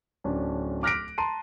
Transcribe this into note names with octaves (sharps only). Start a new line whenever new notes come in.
D1 C#4 D4
D6 F6 F#6 A#6 B6 D7
A5 A#5 C6 D#7